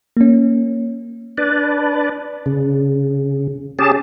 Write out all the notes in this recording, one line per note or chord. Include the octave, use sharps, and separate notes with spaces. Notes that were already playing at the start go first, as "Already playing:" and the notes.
A#3 C#4
D4 B4 D5
C#3
C#4 G4 G#4 A5